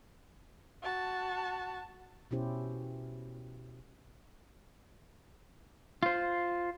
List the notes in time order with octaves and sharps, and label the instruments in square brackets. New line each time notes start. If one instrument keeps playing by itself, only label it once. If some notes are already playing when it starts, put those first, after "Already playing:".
[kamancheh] F#4 A5
[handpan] B2 C#4 E4 G4 C5
[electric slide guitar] F4 C5